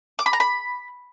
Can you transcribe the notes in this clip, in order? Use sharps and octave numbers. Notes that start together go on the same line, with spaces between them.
D6
B5
A#5
B5